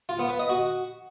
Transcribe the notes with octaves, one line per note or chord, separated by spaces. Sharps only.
F4
B3
B4
D#5
F#4